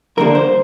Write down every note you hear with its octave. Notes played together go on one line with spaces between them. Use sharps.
F2 D3 G3 A#3 D4 A#4
C5